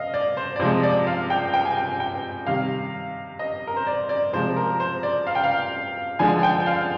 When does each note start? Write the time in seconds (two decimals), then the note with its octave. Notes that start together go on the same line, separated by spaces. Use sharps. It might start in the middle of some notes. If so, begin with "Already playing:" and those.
Already playing: D#5 F5
0.14 D5
0.37 C5
0.56 D5
0.60 C3 F3 G#3 C5
0.83 D5
1.07 F5
1.30 G5
1.54 G5
1.65 G#5
1.77 G5
2.00 G5
2.46 C3 D#3 G3 F5
3.39 D#5
3.67 A#4
3.76 C5
3.87 D5
4.09 D5
4.33 C3 F3 G#3 C5
4.56 A#4
4.80 C5
5.03 D5
5.27 F5
5.35 G5
5.44 F5
6.19 D3 F3 G#3 G#5
6.39 G#5
6.43 G5
6.66 F5